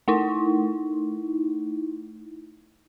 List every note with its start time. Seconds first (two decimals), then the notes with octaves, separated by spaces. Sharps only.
0.08 A3 D#4 E4